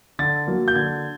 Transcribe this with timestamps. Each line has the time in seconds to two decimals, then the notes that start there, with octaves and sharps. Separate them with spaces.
0.19 D3 A6
0.47 F#3 A#3
0.68 G6
0.75 D3 G#6